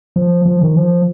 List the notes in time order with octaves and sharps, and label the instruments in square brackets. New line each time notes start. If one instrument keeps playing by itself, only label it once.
[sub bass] F3
F3
D#3
F3